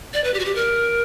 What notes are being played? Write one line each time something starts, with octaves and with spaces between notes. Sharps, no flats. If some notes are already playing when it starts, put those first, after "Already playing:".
D5
B4
G4
F#4
G4
A#4